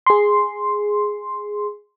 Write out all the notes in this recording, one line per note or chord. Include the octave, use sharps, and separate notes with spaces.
G#4 C6